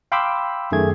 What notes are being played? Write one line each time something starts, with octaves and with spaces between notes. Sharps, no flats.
F5 G5 B5 C6 D6 E6
F#2 D#3 A3 G#4 G#6